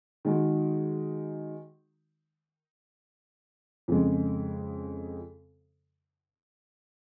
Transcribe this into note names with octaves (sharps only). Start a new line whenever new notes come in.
D#3 G#3 D#4 F#4
F2 C#3 G#3